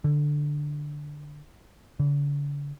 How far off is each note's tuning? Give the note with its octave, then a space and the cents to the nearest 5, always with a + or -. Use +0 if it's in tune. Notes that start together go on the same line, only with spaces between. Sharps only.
D3 +5
D3 -40